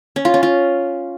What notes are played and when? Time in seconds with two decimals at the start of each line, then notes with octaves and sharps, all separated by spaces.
0.16 C#4
0.25 F4
0.34 C#4
0.43 F4